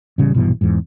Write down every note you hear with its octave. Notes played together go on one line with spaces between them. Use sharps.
A1 C#3 G3
A#1 G2 B2 E3
E2 G#2